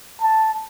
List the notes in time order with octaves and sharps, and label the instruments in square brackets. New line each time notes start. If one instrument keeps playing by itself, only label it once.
[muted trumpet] A5